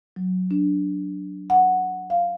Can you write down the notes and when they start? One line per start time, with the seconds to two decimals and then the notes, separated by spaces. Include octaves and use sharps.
0.16 F#3
0.51 D4
1.50 F#5
2.10 F5